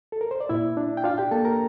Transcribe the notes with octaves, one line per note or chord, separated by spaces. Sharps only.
A4
A#4
C5
D5
A#2 E4 E5
D4
G5
D4 F4 F5
G4 G5
A#3 A4 A5
A#4 A#5